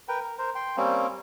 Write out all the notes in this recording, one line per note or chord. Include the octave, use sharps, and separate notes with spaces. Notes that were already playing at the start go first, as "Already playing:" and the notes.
A#4 B4 G5
A#4
A#4 C5
G5 C6
G3 A#3 C4 C#4